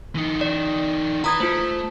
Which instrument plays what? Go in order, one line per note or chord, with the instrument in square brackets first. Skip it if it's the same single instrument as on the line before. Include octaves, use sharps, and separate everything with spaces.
[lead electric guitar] E3 D#4
[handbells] D5
[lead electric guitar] E4 B4 [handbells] A#5 D#6 G#6
[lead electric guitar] A3 [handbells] F4 C5